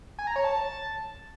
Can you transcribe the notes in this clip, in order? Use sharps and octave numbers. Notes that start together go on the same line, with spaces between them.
G#5
A#5
C#5
A5